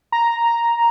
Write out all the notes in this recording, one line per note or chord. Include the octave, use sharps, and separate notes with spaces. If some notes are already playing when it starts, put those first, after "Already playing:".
A#5